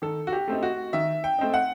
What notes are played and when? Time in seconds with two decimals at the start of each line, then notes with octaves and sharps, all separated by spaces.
0.02 D#3 A4
0.27 F#4
0.33 G4
0.48 A3 C4 D#4
0.63 F#4
0.93 D#3 E5
1.24 G5
1.39 A3 C4 D#4
1.54 F#5